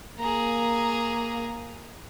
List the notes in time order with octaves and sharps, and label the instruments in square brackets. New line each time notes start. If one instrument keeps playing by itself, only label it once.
[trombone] A#3 [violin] G#4 A#5